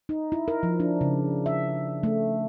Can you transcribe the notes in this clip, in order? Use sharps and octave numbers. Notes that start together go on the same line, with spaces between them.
D#4
E4
A#4
F3
D4
C#3
E5
A3